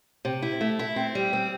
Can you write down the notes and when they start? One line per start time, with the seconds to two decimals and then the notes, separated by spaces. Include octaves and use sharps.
0.25 C3
0.42 E4
0.61 A3
0.79 E4
0.96 C4
1.15 G3
1.33 C4